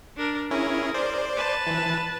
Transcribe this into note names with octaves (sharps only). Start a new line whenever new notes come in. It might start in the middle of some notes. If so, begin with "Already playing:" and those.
D4 A#4
C#4 E4 G#4 A#4
C5 D5
B4 A5
E3